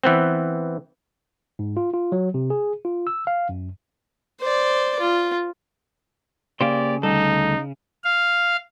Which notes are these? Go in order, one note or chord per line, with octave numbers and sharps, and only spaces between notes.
E3 B3 C4
G#2
F4
F4
F#3
C3
G#4
F4
E6
F5
F#2
C5 D5
F4
C#3 A#3 G4 C5 D5 F5
D2 G3 D#4 A4
F5